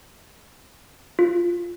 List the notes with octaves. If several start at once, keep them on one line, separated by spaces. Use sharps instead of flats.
F4